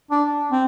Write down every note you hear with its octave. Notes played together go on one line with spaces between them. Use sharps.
D4
C4